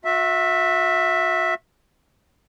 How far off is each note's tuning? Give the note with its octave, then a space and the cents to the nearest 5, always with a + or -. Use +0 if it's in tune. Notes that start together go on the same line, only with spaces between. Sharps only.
F#4 -40 E5 +0